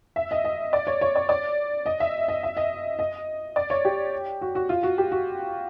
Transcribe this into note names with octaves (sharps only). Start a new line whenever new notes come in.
E5
D#5
D#5
D5
C#5
C#5
D5
D5
D#5
E5
D#5
E5
D#5
D#5
D5
C#5
G4
F#4
F#4
F4
F#4
G4
F#4